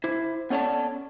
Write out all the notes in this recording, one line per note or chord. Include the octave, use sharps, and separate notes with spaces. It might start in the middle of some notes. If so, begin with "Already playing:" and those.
E4 C5
B3 C#4 A4 C#5 D5 A5